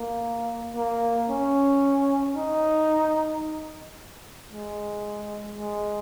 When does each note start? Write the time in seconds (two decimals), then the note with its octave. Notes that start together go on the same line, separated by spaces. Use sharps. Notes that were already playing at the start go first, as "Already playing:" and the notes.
Already playing: A#3
0.76 A#3
1.30 C#4
2.36 D#4
4.52 G#3
5.59 G#3